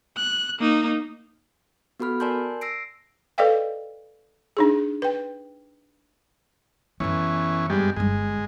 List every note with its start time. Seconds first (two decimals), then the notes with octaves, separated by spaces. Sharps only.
0.17 F#6
0.59 A#3 D#4
2.00 B3 F#4 A4 B5 F6
2.20 A#4 D5 G#5 A5 C6 G6
2.61 E6 A#6 C7 D7
3.38 A4 B4 D5 D#5 F5 G5
4.57 D4 D#4 G#4
5.02 B4 G5
7.00 F#2 E3 B3 C#4
7.70 G2 G3 G#3
7.96 G1 G2 G#3